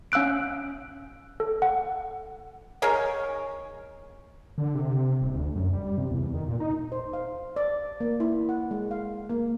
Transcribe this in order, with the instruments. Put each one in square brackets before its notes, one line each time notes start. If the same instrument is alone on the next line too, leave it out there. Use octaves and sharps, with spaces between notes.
[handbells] C#4 F5 E6 F#6 D7
A4
F#5
[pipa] D#3 G#4 A#4 C#5
[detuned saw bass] D3
C3
D#1
D2
F#2
G3
C3
E2
E2
D#3
A#2
D#4
[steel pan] C5
F5
D5
A#3
E4
F#5
G#3
F5
A#3